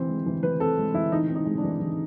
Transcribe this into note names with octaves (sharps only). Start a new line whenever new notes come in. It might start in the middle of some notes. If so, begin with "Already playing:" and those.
Already playing: E3 C4 C5
G#3
E3
E3 B4
C4 A4
G#3
E3 E4
E3 D#4
C4
D#4
G#3
D4
E3
E3